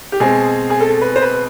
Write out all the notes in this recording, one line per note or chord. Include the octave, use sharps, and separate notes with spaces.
G4
B2 G#3 C4 G#4
G#4
A4
B4
C5
B4